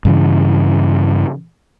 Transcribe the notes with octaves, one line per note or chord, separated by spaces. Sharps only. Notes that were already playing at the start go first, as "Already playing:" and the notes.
G2 C#3 E3